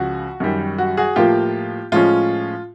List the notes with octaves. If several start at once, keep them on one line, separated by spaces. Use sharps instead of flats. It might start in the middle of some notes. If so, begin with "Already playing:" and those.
Already playing: C#2 C#3 F3 F#4
F#2 D#3 G3
F#4
F#4 G#4
A2 F3 A#3 F4 G4
A2 F3 G#3 C#4 F4